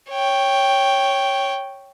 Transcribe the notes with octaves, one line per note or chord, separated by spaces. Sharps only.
C#5 G5